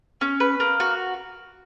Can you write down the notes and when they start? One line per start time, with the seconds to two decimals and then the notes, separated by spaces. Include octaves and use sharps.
0.21 C#4
0.40 B4
0.60 A#3
0.80 F#4